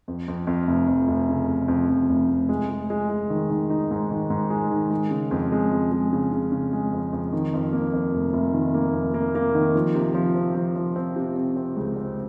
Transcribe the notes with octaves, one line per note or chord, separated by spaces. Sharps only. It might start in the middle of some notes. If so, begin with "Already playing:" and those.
F2
F2
F2
F1
F2
F1
C#3
F1
F2
F2
F1
F1
G#3
G#3
G#3
G#3
D#3
D#3
D#4
G#2
D#3
G#2
G#3
D#3
G#3
C#3
F2
G#3
F2
G#3
C#3
C#3
C#3
G#3
F2
F2
D#3
F2
A#3
F2
F1
F1
D#3
A#3
F2
A#3
A#3
D#3
F3
C3
F3
C4
F3
F3
C4
C3
C4
C4
C#2
C4